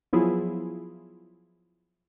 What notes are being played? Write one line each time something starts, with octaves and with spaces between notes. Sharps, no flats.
F3 F#3 B3 E4 F4 G#4